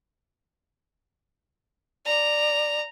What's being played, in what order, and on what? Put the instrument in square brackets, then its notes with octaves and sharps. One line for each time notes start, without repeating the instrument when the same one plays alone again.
[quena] D5 [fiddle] A#5